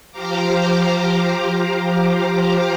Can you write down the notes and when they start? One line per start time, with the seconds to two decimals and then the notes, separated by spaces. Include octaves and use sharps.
0.11 F3 G4 C5 F5 A#5 D6